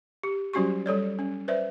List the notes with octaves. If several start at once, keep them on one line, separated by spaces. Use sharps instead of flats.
G4
F#3 G3 C#4 F#4 G4 C#6
G3 A4 C#5 D5
C#4
B4 C5 D5 E5